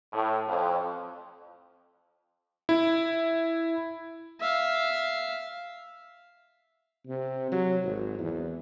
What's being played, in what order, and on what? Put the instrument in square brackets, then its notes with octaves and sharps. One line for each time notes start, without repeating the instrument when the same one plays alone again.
[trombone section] A2
F2
[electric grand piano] E4
[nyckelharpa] E5 F5
[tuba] C3
F#3
G#1
E2